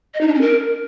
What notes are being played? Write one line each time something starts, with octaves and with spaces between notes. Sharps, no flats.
D#5
D#4
D4
C#4
A#4